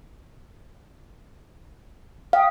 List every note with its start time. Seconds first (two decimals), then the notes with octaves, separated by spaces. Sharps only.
2.33 F5 G5 D#6